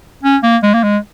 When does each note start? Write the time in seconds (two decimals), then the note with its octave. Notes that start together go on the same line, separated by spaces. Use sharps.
0.23 C#4
0.43 A#3
0.63 G#3
0.74 A#3
0.83 G#3